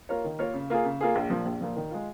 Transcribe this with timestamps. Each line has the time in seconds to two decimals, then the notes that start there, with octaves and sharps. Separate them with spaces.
0.09 A#3 F4 A#4 C#5
0.24 D#3
0.39 A#3 F4 A#4 C#5
0.54 C#3
0.70 A#3 F4 G#4
0.85 C#3
1.01 A#3 F4 G#4
1.15 A#1
1.30 A#2 F3
1.45 A#1
1.61 A#2 F3
1.76 D#3
1.91 G#3 F4